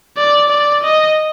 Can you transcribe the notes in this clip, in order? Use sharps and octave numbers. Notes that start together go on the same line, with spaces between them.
D5
D5
D#5